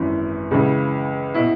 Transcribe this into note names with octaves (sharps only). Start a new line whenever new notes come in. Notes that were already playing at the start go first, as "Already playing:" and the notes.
Already playing: G#1 F#2 E3 E4
C#2 C#3 E3
B2 E4